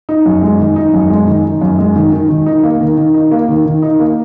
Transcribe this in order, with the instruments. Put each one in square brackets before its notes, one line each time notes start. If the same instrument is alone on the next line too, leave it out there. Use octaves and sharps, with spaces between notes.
[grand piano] D#4
F#2
G#3
D#3
D#4
F#2
G#3
D#3
D#4
F#2
G#3
D#3
D#3
D#3
D#4
A#3
D#3
D#3
D#4
A#3
D#3
D#3
D#4
A#3